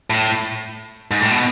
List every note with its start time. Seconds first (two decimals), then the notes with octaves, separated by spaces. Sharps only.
0.10 A2
1.11 G#2
1.21 A2
1.31 B2